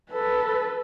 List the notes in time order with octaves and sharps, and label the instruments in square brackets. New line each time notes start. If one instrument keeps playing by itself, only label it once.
[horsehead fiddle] A4 B4